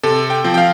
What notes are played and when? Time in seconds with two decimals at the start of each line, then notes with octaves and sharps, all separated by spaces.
0.03 C3 A4
0.30 G5
0.44 F3 C4
0.54 G5
0.58 F5